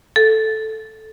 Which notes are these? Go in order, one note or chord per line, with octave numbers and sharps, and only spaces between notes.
A4